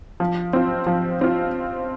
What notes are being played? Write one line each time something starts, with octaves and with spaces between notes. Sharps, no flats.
F3
C4 F4
F3
C4 F4